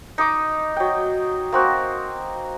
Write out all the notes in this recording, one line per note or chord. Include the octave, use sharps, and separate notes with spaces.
D#4 D#5 D6
F#3 G5
A#3 C4 F#4